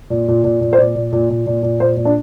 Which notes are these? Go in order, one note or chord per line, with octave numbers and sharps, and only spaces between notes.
A#2
A#2
A#2
A#2
C5
A#2 D5
A#2
A#2
A#2
A#2
A#2
A#2 C5
A#2
D4